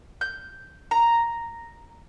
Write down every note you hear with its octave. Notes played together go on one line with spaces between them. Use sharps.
G6
A#5